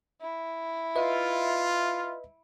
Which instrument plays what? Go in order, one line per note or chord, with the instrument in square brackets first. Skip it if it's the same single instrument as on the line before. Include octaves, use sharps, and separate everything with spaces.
[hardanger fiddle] E4
[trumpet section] F4 [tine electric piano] B4 D#5 E5